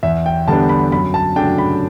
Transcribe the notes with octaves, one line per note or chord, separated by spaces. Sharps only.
E2 E5
G5
D3 G3 B3 D4 A5
B5
F#2 B5
A5
C#3 F#3 A3 D4 G5
B5